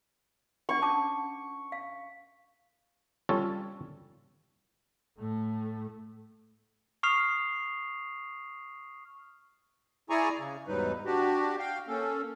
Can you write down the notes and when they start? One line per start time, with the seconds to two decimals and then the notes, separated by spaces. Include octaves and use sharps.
0.69 D4 F#5 C#6
0.81 C#4 A5 D6
1.72 F5
3.29 G3 C#4 F4 A4 C#5
5.17 A2 A3
7.03 C#6 D#6 F6 C7 F7
10.10 E4 G#4 D5 G#5 A#5 C#6
10.39 C#3
10.67 E2 G#2 F#3 G3 D#4 B4
11.05 D4 F#4 G4
11.59 F5 G5
11.88 A#3 C#4 A4